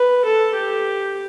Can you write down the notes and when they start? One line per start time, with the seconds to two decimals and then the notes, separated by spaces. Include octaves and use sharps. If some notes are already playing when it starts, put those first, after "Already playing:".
Already playing: B4
0.25 A4
0.54 G4